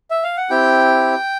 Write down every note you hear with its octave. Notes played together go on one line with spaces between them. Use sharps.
E5
F5
F#5
C4 E4 G4 G5